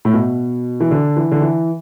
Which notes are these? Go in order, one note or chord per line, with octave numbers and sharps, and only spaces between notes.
A2
B2
E3
D3
E3
D3
E3